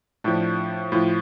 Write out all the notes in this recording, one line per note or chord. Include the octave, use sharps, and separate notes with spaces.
A2 F3 D4
A2 F3 F4